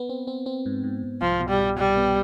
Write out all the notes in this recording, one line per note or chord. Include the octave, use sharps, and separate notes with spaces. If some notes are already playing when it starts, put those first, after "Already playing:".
Already playing: B3
C4
C4
C4
G#2
G#2
G#2
C2 F3
B2
G3
B2
C2 G3
B3